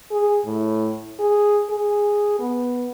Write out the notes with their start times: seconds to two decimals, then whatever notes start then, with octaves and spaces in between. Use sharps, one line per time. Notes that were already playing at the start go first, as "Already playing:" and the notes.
0.11 G#4
0.45 A2
1.20 G#4
1.70 G#4
2.40 B3